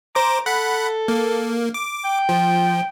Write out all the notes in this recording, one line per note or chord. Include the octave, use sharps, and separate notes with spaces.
C5 A#5 D6
A4 F#5 B5
A#3
D6
G5
F3